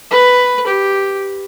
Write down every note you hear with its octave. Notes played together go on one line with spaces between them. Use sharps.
B4
G4